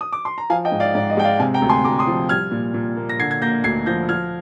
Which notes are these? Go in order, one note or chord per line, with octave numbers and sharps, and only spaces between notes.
D#6
D6
C6
A#5
F3 F5 G#5
D#5 G5
G#2
D5 F5
G#2 D5
D#5
G#3 G5
D5 F5
C3 F5 G#5
G5 A#5
D2
G#5 C6
D2 A#5 D6
C6 D#6
F3
G3 F6 G#6
A#2
A#2
A#3
A#6
D3 G#6 C7
G#6
A#3 G6 A#6
D2 G#6 C7
F3 G6 A#6
F3 F6 G#6